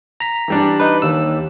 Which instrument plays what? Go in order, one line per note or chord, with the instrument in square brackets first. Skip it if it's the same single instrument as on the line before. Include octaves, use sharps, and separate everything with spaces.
[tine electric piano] A#5 B6
[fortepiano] E3 G3 D4
[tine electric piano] D#4 B4
D#2 E6